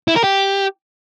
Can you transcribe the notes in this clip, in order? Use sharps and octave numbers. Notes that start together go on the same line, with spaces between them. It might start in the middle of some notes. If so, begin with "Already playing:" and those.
E4
A#4
G4